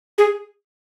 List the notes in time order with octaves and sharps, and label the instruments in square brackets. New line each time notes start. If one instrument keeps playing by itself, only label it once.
[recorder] G#4